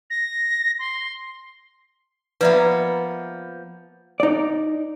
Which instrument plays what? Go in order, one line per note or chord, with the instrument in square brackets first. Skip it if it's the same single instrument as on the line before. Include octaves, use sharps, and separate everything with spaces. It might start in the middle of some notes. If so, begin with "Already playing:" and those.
[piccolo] A#6
C6
[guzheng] F3 A#3 B3 [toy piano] B4 D5 E5
[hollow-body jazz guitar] D#4 D5